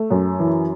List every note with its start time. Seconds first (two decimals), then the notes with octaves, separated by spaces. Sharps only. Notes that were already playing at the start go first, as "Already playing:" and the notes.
Already playing: A3
0.11 F#2
0.39 E3